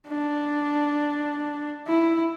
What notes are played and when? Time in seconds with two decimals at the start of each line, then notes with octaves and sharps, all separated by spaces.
0.08 D4
1.88 E4